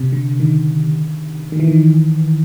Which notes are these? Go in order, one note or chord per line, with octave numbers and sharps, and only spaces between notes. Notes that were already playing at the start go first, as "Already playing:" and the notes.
Already playing: C3
D3
D#3
D#3
E3
D#3